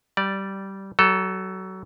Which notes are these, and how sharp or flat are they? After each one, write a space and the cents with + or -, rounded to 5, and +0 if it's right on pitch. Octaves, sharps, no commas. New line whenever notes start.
G3 -15 D5 +0
F#3 +30 A4 +0